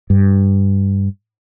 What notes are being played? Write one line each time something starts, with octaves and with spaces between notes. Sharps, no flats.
G2